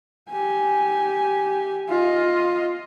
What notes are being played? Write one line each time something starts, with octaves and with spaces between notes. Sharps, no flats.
G4 G#5
F4 D#5